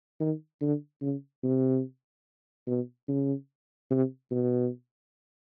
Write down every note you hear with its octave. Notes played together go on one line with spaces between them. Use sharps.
D#3
D3
C#3
C3
B2
C#3
C3
B2